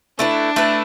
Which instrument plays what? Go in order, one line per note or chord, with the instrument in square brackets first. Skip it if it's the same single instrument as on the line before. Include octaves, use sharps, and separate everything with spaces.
[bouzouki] A3 E4 B4 [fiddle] D4
[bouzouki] A3 E4 B4